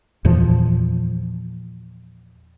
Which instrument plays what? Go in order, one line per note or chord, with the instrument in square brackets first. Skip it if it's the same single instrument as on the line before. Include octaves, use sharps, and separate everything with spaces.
[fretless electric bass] E2 A#2 E3 F3